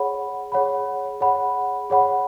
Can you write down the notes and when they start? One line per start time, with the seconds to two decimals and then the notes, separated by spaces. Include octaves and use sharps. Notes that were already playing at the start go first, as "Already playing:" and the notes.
Already playing: G#4 C#5 F#5 B5
0.52 G#4 C#5 F#5 B5
1.21 G#4 C#5 F#5 B5
1.90 G#4 C#5 F#5 B5